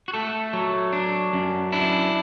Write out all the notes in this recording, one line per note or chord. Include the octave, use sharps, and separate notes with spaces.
F#4
A3 A4
F#3
D4
F#2
D4 E4